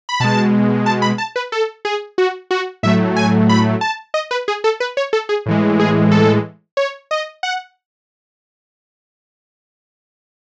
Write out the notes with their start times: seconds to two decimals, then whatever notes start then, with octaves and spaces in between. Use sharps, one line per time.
0.09 B5
0.20 B2 G#3 A5
0.86 A5
1.02 B5
1.18 A5
1.36 B4
1.52 A4
1.85 G#4
2.18 F#4
2.51 F#4
2.83 A2 F#3 A3 E5
3.16 G#5
3.49 B5
3.81 A5
4.14 D#5
4.31 B4
4.48 G#4
4.64 A4
4.80 B4
4.97 C#5
5.13 A4
5.29 G#4
5.46 A2 E3 G#3
5.79 G#4
6.11 A4
6.77 C#5
7.11 D#5
7.43 F#5